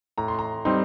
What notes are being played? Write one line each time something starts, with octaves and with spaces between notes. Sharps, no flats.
A2 A#5
C6
A#5
G3 C4 D#4 C6